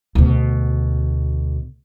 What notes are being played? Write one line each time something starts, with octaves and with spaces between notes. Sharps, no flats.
D2 B2